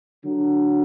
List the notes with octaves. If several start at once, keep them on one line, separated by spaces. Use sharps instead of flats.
D3 F#3